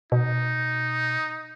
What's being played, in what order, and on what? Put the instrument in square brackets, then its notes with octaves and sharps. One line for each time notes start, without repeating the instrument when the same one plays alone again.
[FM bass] B2 [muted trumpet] D#4